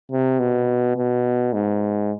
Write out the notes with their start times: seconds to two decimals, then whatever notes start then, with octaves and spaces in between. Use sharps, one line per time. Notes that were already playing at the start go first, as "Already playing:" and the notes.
0.12 C3
0.39 B2
0.97 B2
1.53 G#2